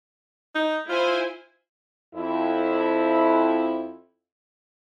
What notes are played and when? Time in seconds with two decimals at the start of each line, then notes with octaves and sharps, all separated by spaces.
0.55 D#4
0.89 E4 F4 C5 G#5
2.14 F2 E4